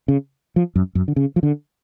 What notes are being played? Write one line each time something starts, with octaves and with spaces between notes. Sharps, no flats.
C#3
F3
F#2
F#2
D3
C#3
F3
D3